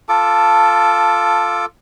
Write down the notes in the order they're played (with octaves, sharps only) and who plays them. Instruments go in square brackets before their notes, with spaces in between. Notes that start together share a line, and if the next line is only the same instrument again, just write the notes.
[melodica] F4 A4 D6 [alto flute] A5